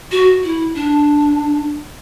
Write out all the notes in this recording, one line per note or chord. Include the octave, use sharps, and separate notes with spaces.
F#4
E4
D4